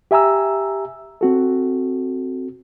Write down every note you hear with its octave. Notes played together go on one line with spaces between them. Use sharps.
G4 E5 G#5 A#5 E6
C4 F#4 A4